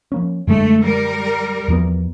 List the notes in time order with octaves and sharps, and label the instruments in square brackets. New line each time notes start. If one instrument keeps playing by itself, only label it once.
[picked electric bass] F3 A#3 C#4
[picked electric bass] F#2 D3 G#3 [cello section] A3
[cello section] G3 A#4
[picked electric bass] E2 F3 B3